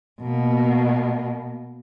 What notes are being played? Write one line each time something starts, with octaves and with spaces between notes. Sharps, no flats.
B2 A#3